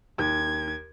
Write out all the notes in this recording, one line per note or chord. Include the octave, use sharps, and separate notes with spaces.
D#2 G#6